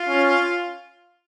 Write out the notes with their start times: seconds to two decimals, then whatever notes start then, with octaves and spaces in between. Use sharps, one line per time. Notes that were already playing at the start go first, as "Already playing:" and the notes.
Already playing: F4
0.08 C#4